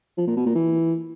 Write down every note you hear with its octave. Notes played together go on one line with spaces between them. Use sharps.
F3
A#2
B2
A#2
E3